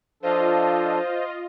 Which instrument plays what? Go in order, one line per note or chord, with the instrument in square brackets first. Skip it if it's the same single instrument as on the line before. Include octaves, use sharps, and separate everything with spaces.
[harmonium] F3 D4 A4 [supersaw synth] F4 D#5 [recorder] C5